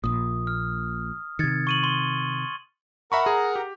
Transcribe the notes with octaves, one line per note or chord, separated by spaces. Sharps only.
A#1 A#2 D#6
F6
C3 D#3 G#6 A6 C#7
C#6 D#7 F#7
C6 G7
A#4 E5 F#5 A#5 B5 C#6
G#4
G4